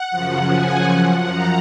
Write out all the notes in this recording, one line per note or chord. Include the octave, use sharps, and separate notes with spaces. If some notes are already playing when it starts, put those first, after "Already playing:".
Already playing: F#5
F#2 C#3 F3
G#5
F#2 F3 F#5
A#5